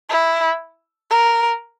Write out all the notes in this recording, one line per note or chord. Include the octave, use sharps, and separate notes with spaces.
E4
A#4